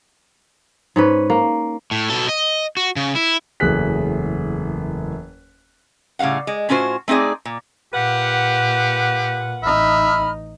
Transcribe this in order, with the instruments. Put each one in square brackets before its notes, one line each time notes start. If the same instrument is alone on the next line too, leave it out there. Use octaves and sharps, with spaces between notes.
[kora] G#2 C#4 B4
A#3
[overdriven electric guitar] A2
B2 A4
D#5
F#4
C#3
E4
[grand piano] F#1 E2 A3 G#4 F#6 B6
[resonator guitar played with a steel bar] A2 C#3 G3 F5 F#5
G#3
A2 C#4 F4 F#4 C5
A3 C4 D#4 G#4 D5
A#2
[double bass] A#2 [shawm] G4 [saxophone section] B4 F5 F#5
[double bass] A1 D#4 [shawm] E5 [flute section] B5 F6